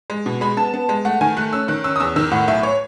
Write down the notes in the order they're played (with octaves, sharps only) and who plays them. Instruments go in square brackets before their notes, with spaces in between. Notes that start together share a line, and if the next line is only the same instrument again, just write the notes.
[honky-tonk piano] G#3
B2
G#3 B5
B3 A5
B3
G#3
A3 F#5
D#3 G#5
A3 F#6
C#4 E6
D#3 F#6
C#4 E6
D#6
E2 E6
D#3 E6
A2 F#5
B1 E5
C#5